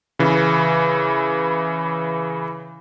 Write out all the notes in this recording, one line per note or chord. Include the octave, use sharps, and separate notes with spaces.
C#3 E3